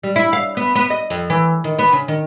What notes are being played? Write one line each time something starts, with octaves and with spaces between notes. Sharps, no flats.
G3
E4
F5
B3
B3
D#5
F2
E3
D#3
B3
C#3
D#3